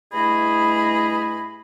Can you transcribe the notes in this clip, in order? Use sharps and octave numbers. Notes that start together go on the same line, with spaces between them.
G2 A3 E4 G#4 D#5 B5